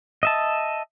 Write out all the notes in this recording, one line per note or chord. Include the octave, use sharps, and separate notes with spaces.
D#5 E5 A5